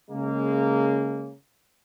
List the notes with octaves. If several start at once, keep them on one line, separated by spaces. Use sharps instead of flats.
C#3 G#3 A#3